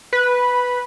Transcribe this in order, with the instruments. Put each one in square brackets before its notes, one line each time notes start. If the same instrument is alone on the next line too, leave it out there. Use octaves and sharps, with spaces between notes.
[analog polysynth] B4